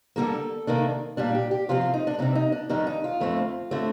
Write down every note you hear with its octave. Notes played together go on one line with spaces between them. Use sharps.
D3 G3 A#3 A4
C3 D#3 A#3 D4
A#2 G3 D4 G4
G4
G4
C3 F3 C4 F4
F4
D#4
D4
C3 G3 C4 D#4
D#4
D4
F2 D#3 G3 D4 D#4
D#4
F4
F2 D3 A3 C4
D3 A3 C4